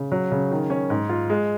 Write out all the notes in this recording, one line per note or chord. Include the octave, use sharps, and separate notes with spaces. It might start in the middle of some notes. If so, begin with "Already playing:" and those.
Already playing: C#3
F#3
C#3
D#3
C#4
G#2
F4
G#3